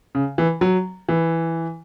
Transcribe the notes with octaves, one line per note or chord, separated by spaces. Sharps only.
C#3
E3
F#3
E3